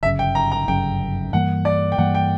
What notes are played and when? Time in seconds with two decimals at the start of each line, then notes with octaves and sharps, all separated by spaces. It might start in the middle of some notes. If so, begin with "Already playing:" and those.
0.03 G1 F#2 C#3 E5
0.19 G5
0.35 A#5
0.52 A#5
0.68 G1 F#2 C#3 G5
1.33 G2 E3 G3 A#3 F#5
1.65 D5
1.92 G5
1.98 G2 E3 G3 A#3 F#5
2.15 G5